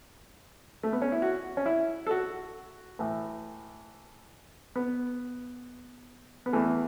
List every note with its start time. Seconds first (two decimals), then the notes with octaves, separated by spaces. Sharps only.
0.83 A3
0.93 B3
1.02 C#4
1.12 E4
1.22 F#4
1.57 C#4
1.66 E4
2.07 A4
2.11 F#4
2.99 A2 E3
4.76 B3
6.46 B3
6.53 E2 E3 A3